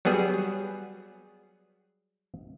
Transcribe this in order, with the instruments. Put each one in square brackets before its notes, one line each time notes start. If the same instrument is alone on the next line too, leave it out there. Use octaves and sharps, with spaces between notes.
[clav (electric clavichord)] F#3 G3 B3 G#4